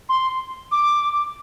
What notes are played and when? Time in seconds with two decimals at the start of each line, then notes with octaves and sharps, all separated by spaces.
0.09 C6
0.72 D6